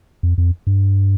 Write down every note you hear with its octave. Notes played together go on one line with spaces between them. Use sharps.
F2
F2
G2